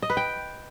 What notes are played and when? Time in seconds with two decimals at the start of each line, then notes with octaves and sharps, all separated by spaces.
0.02 D#5
0.10 B4
0.17 G5